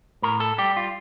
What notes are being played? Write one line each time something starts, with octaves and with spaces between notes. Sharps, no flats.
A2 A#4
A4
G3 G4
F4